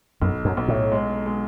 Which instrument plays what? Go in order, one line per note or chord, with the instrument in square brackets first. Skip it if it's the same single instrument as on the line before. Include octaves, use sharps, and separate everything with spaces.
[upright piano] B1 [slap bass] F#2
[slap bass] F#2
[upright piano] B1
[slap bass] A2
[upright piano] G#3
G#3